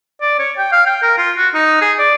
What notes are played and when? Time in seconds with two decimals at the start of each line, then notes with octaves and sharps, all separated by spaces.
0.21 D5
0.39 C#5
0.58 G5
0.72 F5
0.86 G5
1.02 A#4
1.18 F4
1.37 F#4
1.54 D#4
1.81 G#4
1.99 D5